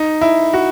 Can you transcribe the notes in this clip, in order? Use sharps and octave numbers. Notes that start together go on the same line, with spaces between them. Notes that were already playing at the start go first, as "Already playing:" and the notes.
Already playing: D#4
E4
F#4